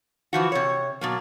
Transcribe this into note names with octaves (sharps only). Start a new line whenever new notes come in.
E3 F3 F#4
C3 C#5
B2 F#3 A#3